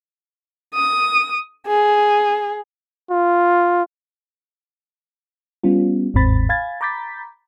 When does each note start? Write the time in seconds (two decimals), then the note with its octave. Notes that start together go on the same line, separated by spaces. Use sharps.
0.74 D#6
1.68 G#4
3.10 F4
5.64 G3 B3 C#4 F4
6.14 G1 D#2 G#2 C4 B5 A6
6.49 F5 G#5 B5 G#6 A6
6.81 A#5 B5 D6 G6 A6 B6